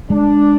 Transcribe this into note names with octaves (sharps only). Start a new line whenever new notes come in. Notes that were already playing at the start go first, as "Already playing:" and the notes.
G#3 D4